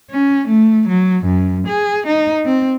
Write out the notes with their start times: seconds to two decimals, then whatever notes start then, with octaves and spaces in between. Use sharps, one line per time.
0.10 C#4
0.48 A3
0.88 F#3
1.25 F#2
1.67 G#4
2.07 D#4
2.45 C4